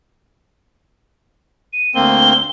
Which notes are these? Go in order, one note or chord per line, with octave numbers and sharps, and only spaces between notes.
D#7
D2 A#3 C4 G7